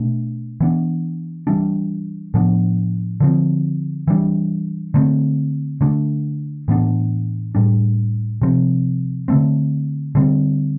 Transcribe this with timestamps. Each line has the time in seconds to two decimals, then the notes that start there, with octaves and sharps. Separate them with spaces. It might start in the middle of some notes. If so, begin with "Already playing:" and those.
Already playing: B2 A3 D4
0.61 E3 B3 D4
1.47 E3 G3 D4
2.34 A2 F3 B3 D4
3.20 D3 F3 C4
4.08 E3 G3 D4
4.94 D3 A3 C4
5.81 D3 A3 D4
6.68 A2 E3 B3 D4
7.55 A2 G3 D4
8.42 C3 F3 C4
9.28 D3 A3 C4
10.15 D3 G3 C4